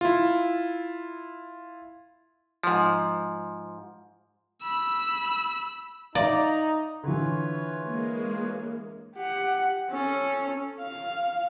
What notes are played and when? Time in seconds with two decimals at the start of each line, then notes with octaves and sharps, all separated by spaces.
0.01 E4 F4
2.63 G#2 F3
4.61 B5 E6
6.15 D#4 D5 E5 F5 A#5
7.03 D3 E3 F4 B4 C#5
7.83 G#3 A#3
9.16 G4 F#5
9.90 C#4 A4
10.81 F5